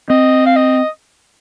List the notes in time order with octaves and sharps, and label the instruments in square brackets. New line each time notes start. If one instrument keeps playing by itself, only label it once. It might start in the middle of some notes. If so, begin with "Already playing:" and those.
[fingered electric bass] C4 [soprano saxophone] D#5
[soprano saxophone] F5
D#5